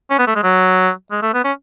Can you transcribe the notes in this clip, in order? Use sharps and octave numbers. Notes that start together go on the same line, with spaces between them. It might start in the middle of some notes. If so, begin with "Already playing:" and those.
C#4
B3
A3
G#3
F#3
G#3
A3
B3
C#4